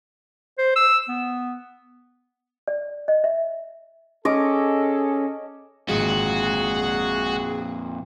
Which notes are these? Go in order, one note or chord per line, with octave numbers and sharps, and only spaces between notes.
C5
E6
B3
D5
D#5
E5
C#4 G#4 A4 D#5 D6
G#1 F2 A#2 G#3 F#4 G#4